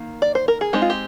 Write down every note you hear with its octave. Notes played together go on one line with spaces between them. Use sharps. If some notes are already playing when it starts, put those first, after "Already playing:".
Already playing: D#3 A#3
D5
C5
A#4
G#4
G#3 C4 D#4 G4
F4
G4